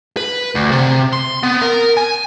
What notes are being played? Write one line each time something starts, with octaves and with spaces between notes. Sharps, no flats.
B4
D2
C3
C6
B3
A#4
G#5